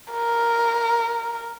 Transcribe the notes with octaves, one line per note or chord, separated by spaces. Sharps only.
A#4